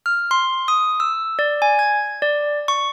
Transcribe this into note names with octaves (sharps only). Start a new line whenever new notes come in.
F6
C6
D#6
E6
D5
G#5
G#6
D5
C#6